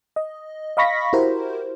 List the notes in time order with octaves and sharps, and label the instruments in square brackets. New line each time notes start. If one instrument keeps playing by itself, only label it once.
[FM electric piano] D#5
D#5 F5 B5 C#6 A#6 B6
E4 F#4 G4 A#4 C5